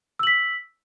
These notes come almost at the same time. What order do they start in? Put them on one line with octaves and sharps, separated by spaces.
E6 F#7 B6